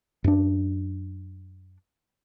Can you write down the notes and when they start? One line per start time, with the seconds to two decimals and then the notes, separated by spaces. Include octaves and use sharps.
0.24 F#2 D4